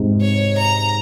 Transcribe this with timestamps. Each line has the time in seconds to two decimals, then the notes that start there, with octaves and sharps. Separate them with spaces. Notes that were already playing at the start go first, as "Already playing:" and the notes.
Already playing: G#2 C3
0.21 C#5
0.58 A#5